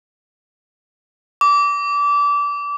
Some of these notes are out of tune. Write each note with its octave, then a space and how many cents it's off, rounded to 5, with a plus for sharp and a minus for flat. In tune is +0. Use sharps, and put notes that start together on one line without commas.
D6 -25